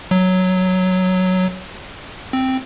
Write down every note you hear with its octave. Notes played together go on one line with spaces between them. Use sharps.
F#3
C4